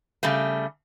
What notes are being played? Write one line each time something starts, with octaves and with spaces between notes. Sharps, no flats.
C#3 G3 A3